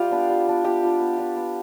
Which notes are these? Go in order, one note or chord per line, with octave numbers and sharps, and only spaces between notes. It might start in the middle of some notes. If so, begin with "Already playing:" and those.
Already playing: G3 F4 G4
B3 D4
G3
B3 D4
B3 G4
D4 F4
B3
D4 F4
B3